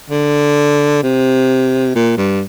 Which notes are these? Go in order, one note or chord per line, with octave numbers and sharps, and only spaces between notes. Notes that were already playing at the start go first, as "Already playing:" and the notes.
D3
C3
A#2
G2